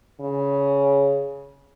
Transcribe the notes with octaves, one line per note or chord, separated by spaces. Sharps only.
C#3